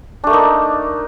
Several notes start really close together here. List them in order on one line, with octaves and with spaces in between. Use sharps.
D4 A3 A#3 D#4